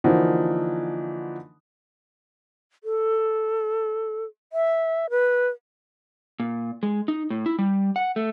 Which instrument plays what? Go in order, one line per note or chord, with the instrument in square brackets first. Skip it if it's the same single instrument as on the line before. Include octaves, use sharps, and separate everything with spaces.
[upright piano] D3 E3 F3 A#3 D#4 F#4
[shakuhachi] A4
E5
B4
[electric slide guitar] A#2
G#3
D#4
A2
E4
G3
F#5
A3